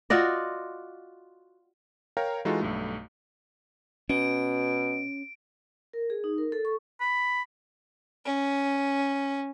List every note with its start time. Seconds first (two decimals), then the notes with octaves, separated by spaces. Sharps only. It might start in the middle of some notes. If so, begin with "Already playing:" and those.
0.10 F4 F#4 D5 D#5
2.17 A#4 C#5 F5 G5 A#5
2.45 E3 G#3 D#4 F4 F#4 A4
2.61 B1 G2 A3
4.09 B2 C#4 D7
5.93 A#4
6.10 G#4
6.24 D#4
6.38 A#4
6.52 A4
6.65 C#6
7.01 B5
8.26 C#4